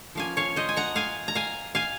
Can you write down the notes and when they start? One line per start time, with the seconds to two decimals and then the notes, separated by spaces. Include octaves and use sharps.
0.15 F3 A#3 C#4 F5 G#5
0.37 C#5 F5
0.56 C5 D#5
0.69 G#5
0.76 F#5 A#5
0.96 F5 G#5
1.28 A#5
1.35 F5 G#5
1.75 F5 G#5